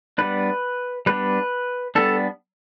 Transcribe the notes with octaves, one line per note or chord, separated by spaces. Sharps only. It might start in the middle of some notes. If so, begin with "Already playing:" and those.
G3 B3 D4 B4
G3 B3 D4 B4
G3 B3 D4 A4